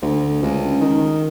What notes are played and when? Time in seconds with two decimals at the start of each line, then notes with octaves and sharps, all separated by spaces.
0.02 D2
0.42 C#2
0.81 D#3